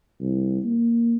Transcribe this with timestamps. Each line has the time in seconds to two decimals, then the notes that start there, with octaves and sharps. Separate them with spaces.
0.20 C2
0.64 A#3